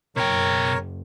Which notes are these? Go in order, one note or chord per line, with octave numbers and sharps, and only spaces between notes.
F#1 B2 A#4 C#5 G5